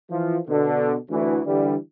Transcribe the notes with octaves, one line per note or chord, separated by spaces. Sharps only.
E3 F3
B2 D3
D2 E3
D3 E3 G3